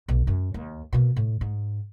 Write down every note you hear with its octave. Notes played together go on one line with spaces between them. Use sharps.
B1
F#2 C#4
D#2
B2 A#3
A2
G#2